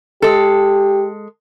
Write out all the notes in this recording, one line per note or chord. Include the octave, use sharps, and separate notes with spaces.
G#3 G4 A4